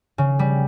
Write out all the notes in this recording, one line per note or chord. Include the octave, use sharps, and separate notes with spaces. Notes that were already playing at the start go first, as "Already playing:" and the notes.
C#3
G3